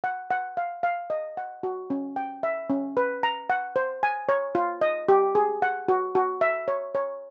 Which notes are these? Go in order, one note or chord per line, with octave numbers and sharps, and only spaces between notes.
F#5
F#5
F5
F5
D#5
F#5
F#4
C#4
G5
E5
C#4
B4
A#5
F#5
C5
G#5
C#5
F4
D#5
G4
G#4
F#5
F#4
F#4
E5
C#5
C#5